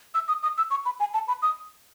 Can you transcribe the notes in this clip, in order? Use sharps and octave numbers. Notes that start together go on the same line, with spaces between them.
E6
D#6
D#6
E6
C#6
B5
G#5
A5
B5
D#6